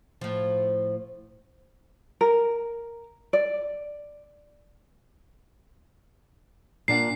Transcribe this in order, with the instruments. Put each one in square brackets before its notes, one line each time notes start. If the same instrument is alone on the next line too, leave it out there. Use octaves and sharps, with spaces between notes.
[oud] A2 F3
[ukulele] A#4
D5
[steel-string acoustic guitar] A#2 D4 F#5 [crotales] C7